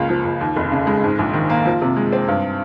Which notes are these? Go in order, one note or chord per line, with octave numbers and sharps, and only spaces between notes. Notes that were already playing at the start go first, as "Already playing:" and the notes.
Already playing: C#2 C#3 A#3
F3
C#2
D#2
F1
C#3
G#3
G#2
A#1
D#3
A#3
F3
C3
G#3
C4
G2